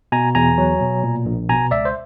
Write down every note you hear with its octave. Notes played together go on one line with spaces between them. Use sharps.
B2 G#5 A#5
E2 G#5 A#5
F#3
B2
A#2
A#1
B2 G#5 A#5
C#2 D5 E5
C5